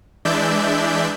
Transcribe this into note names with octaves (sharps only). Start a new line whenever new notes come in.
E3 G#3 D4 D5 E5 G6